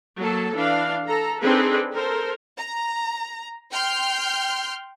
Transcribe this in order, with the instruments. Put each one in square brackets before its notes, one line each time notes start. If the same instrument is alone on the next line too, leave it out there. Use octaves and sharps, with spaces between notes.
[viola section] F#3 A#3 A4 A5
E3 D4 F5
A4 A#5
C4 D4 D#4 G#4 A4 B4
A4 A#4 C5
[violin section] A#5
G5 C6 F6 G6